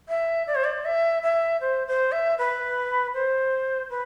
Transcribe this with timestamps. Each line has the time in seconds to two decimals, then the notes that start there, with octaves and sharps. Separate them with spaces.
0.09 E5
0.47 D5
0.55 C5
0.64 D5
0.85 E5
1.23 E5
1.61 C5
1.87 C5
2.12 E5
2.38 B4
3.14 C5
3.90 B4